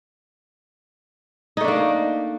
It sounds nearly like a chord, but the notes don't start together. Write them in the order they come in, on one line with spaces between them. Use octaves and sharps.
D#4 A3 D4 A#3